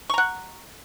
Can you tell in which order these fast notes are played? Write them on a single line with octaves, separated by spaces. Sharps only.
C#6 A#5 F#5